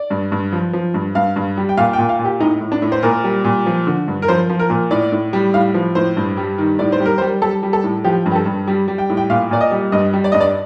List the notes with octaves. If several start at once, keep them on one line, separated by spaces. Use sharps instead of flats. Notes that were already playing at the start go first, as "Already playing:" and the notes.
Already playing: D5
G2
G2
F3
F3
G2
G2 F5
G2
G3
G5
A#2 F5
G5
A#2
F5
A#2
G4
A2 D#4
A2
D4
A2
C5
A#2 A#4
G3
A#2
F3
D3
G2
A#4
F3 C5
F3
A#4
A#2
A2 D5
A2
G3
A2 F5
F3
A2 C5
G2
G3
D#3
A2 D5
C5
G3
A#4
C5
G3
G3 A4
G3
A4
A2
F3 G4
G2
G4
A4
G2
G3
G3
G5
A2
G5
A#2 F5
A#2 D5
D#5
G3
G2 D#5
G3
D5
G2 D#5
D5